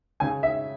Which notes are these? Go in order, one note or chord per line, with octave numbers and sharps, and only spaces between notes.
C#3 G#5
E5